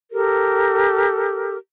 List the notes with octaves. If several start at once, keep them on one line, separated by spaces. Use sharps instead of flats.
G4 A4 A#4